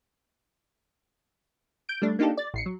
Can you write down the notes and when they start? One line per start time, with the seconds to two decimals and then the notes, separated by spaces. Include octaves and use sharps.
1.89 G6 D7
2.02 G3 A3 D4
2.19 A#3 D4 D#4 F4 G4 A4
2.37 D5 A6
2.54 A1 C7 C#7
2.66 F#3